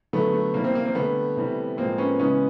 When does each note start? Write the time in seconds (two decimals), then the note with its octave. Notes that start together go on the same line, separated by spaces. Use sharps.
0.13 D3 F#3 A3 B3
0.33 A3
0.54 C3 E3 G3 A#3
0.64 A#3 C4
0.75 A#3 C4
0.85 A#3 C4
0.95 D3 G3 A3 B3
1.37 C3 E3 G3
1.77 A2 F3 G#3 A#3 C4
1.98 B3 C#4
2.19 C#3 E3 G#3 B3 C#4